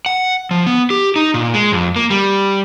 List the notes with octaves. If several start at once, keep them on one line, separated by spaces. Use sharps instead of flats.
F#5
F3
B3
G4
D#4
A#2
G#3
F2
A#3
G3